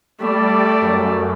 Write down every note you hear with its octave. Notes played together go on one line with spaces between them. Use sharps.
G3 A3 D5
F#2